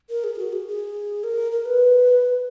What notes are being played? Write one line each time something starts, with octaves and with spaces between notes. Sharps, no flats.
A#4
G#4
G#4
F#4
G#4
G#4
A#4
A#4
B4